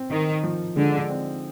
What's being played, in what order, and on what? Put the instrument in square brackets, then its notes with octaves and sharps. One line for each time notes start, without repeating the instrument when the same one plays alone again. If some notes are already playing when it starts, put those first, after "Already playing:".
Already playing: [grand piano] C4
[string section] D#3 [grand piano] D#4
[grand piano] F3
[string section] D3 [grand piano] G#3
[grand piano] C4